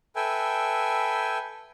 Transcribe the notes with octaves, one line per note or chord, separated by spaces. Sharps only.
A4 B4 E5 G5 G#5